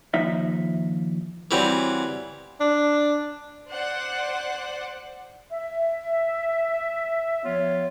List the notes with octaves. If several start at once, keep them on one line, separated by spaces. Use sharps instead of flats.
D#2 F3 D#4 E5
E3 F#3 G3 C4
D4
C5 D5 F#5
E5
F3 B3 F4 C#5